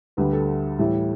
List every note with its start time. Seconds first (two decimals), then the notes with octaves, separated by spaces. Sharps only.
0.17 D2 D3 G3 B4
0.33 A4
0.79 A2 E3 G3